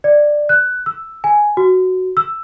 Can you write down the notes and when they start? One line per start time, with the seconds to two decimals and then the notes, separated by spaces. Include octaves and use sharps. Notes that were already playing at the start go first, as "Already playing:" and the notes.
0.04 D5
0.49 F#6
0.86 E6
1.24 G#5
1.57 F#4
2.17 E6